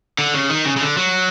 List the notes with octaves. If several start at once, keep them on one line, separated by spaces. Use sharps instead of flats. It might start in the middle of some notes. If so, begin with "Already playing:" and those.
D3
C#3
D#3
C#3
C#3
D3
F#3